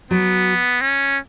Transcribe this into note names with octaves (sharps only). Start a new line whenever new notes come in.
F#3 B3
C#4